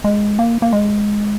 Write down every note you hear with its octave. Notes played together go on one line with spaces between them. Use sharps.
G#3
A#3
A#3
G#3